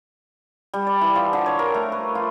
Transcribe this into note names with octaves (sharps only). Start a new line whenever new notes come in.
G3
D5
E3
F3
D3
C#5
A#4
A3
B4
F4